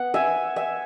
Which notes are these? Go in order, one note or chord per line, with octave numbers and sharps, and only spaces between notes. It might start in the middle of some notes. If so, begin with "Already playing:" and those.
Already playing: B3 F#5
E5 G#5
E5 G#5